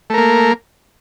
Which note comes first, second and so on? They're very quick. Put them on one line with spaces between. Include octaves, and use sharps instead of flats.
A3 A#4 A#3